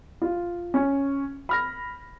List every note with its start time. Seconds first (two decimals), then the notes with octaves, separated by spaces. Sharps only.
0.22 F4
0.74 C#4
1.49 B5 F6 A#6